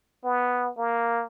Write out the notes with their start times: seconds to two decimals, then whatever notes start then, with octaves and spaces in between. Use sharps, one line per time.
0.24 B3
0.77 A#3